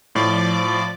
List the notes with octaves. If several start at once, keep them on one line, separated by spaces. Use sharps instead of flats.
A2 F3 D5 D6